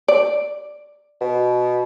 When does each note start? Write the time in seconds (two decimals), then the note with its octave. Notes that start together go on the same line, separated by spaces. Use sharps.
0.08 D5
1.21 B2